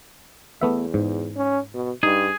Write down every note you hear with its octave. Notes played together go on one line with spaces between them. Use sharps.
E2 A3 B3 E5
G#2
C#4
B2
G2 D#4 G#4